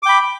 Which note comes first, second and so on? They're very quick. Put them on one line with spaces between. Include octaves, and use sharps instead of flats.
D6 G5 B5